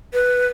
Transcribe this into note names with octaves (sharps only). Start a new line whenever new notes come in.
B4